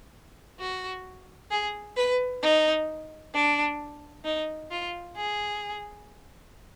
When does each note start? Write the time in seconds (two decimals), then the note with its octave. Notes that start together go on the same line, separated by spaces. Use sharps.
0.60 F#4
1.51 G#4
1.97 B4
2.42 D#4
3.34 D4
4.25 D#4
4.71 F4
5.17 G#4